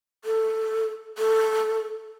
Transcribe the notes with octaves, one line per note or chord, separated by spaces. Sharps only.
A4
A4